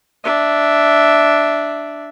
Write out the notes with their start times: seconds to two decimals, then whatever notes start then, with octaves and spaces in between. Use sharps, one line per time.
0.24 D4 E5